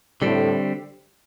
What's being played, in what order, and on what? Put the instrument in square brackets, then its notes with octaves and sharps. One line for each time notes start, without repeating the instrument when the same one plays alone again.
[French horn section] A2 [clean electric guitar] D3 G3 C4